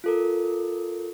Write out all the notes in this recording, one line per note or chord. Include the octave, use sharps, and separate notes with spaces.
F4 A4 A#4